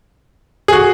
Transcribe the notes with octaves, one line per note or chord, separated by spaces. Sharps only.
G#4
F#4